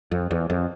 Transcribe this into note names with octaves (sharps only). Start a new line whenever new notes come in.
F2
E2
F2